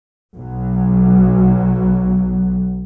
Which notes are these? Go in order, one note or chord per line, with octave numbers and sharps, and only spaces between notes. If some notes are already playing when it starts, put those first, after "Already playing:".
B1 F#3